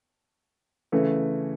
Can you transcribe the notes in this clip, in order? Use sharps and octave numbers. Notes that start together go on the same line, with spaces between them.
C#3 E3 A3